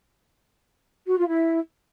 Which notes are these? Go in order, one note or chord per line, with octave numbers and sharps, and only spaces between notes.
F#4
F4
E4